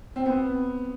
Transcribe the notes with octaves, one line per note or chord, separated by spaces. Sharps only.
C4
B3